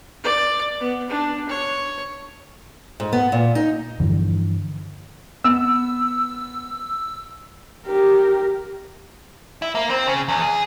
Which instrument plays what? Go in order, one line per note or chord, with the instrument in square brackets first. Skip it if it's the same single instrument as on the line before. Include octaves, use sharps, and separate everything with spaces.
[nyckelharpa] D5
B3
D4
C#5
[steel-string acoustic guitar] G#2
B3
A#2
D#4
[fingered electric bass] G2 D3 E3 F3
[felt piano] B3 [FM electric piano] E6
[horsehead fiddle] G4 A#4
[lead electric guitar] E4
A#3
C4
C#3
E2
G#4